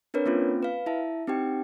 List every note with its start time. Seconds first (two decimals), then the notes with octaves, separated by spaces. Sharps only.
0.14 C4 D4 A#4 B4 C#5
0.26 A#3 C4 C#4 F4
0.63 B4 F5
0.86 E4 E5 A5
1.27 C4 D#4 G4 G5